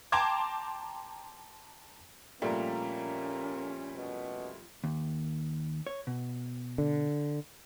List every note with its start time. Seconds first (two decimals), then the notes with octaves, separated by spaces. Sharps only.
0.12 G5 A5 A#5 C6 D6 G#6
2.42 F2 A#2 G3 A3 A#3 C#4 A#5
3.96 B2
4.84 D#2
5.87 C#5
6.07 B2
6.78 D3